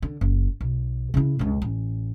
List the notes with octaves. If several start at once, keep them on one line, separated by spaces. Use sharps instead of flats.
D3
F#1
B1
C#3 E4
C#2 G2
A1